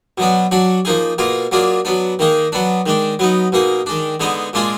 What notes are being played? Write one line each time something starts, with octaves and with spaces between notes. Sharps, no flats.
B2 F#3 B3 D4
F#3 D4 F#4
F3 A#3 D#4 G#4
B2 A#3 F4 G#4
F#3 A#3 D4 F4 G#4
F#3 B3 D4
D#3 A#3 D#4 G#4
F#3 B3 D4
D#3 G#3 D4
F#3 B3 D#4
B2 A#3 D#4 G#4
D#3 G#3 D4
D3 G#3 B3 D#4 G#4
A#2 G#3 D4 F4 G#4